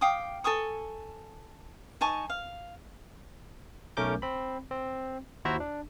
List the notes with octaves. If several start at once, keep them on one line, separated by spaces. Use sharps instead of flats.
F5 G5 D6 D#6
A4 G#5 C#6 D#6
D#4 G#5 A5 C#6
F5
B1 A3 C#4 A#4 D6 G6
C4 B5
C4
D#2 E4 F#4 C5 E5 A#5
D4